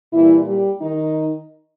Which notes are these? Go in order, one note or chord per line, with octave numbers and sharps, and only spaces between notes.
A#2 E3 G3 E4
G3 G4
D#3 D#4